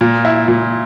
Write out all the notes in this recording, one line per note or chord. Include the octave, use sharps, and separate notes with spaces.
A#2
E4
A#2